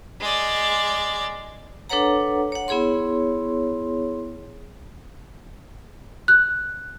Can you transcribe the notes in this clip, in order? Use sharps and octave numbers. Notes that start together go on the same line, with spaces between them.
G#3 D5
D4 A4 B4 C#5 F#5 A#5
C#5 F#5
B3 E4 G#4 C#5 C6
F#6